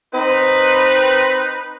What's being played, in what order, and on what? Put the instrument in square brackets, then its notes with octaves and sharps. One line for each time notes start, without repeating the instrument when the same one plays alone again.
[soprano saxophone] C4 [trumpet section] D#4 B4